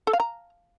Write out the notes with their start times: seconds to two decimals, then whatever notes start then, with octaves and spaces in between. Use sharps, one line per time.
0.07 A4
0.13 F5
0.20 A#5